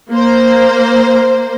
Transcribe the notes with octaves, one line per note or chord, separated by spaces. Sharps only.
A#3 C5